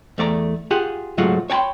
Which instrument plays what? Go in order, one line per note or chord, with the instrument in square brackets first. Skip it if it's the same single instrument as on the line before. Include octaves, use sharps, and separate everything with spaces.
[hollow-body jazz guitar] E2 A3 D5 A#5
F4 G4 G#4 F#5
C#2 G#2 F#3 A3 F4 F#5
C#5 G5 A5 B5 C6